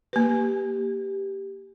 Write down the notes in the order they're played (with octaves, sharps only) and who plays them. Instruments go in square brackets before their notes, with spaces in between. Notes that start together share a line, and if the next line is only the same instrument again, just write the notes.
[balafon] A#3 B4 [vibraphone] G4